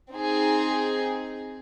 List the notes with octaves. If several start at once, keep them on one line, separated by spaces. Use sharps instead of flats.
C4 D#4 G#4